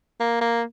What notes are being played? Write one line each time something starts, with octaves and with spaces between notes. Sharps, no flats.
A#3
A#3